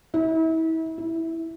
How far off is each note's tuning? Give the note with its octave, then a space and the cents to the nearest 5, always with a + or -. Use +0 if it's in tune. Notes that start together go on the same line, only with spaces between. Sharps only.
E4 -35
E4 -5